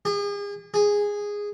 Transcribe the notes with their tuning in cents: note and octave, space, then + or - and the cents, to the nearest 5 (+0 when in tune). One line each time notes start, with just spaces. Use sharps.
G#4 -40
G#4 -10